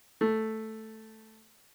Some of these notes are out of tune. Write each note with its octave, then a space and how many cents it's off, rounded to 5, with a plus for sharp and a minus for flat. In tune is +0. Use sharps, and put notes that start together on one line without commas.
A3 +0